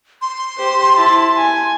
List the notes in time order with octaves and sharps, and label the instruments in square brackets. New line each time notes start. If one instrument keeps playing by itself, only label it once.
[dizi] C6
[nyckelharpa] G4 C5
E4 A5
G#5